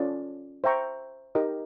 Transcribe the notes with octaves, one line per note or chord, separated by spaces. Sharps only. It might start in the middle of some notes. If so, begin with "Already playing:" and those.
Already playing: C#4 F4 A4 D5
C5 E5 G5 A#5 C#6
D#4 G4 A#4 D#5